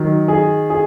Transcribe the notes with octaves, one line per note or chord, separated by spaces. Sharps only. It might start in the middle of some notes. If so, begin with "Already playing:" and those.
Already playing: D#3 F#3
G#4
G#4